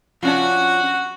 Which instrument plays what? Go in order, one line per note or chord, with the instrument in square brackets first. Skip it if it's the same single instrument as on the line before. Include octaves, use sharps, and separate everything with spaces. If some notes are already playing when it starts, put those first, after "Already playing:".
[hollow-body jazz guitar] F3 C#4 D4 [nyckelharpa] F#4 F#5